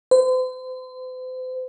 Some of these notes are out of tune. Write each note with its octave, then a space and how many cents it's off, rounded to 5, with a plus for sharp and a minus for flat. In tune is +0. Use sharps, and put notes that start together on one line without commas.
C5 -40